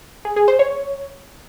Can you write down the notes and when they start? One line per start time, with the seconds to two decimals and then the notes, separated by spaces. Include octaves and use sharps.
0.25 G#4
0.36 G#4
0.48 C5
0.59 C#5